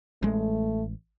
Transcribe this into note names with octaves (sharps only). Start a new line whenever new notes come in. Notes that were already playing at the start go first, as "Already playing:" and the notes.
A1 G#3 A3